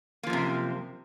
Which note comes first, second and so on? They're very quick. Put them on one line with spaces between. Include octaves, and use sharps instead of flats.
A#3 F3 F#2 C3